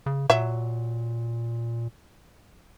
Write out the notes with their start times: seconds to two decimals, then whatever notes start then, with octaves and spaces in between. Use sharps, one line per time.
0.06 C#3
0.30 A#2 F#3 E5